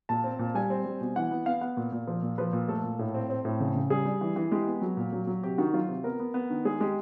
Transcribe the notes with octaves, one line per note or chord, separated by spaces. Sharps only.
A#2 A5
C4
A#2
G3 G#5
C4
G3
B2
E3 F#5
B3
B3 F5
B3 F#5
A#2
A#2
F3
A#2
F3 B4
A#2
A3 A4
A#2
A2
C4
C4
A2
C#3
C#3
G3 G#4
G3
E3
E3
G#3 G4
B3
F#3
A#2
F#3
F#3
C3 G4
D#3 F#4
F#3 F4
C3
B3 A#4
B3
B3
D#3
G#3 G#4
G#3 G4